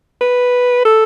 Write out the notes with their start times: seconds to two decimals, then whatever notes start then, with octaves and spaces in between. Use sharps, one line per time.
0.21 B4
0.85 A4